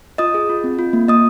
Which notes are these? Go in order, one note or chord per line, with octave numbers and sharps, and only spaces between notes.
F4 D#5 D#6
G#4
F4
C4
F4
A#3
A#3 D#5 D#6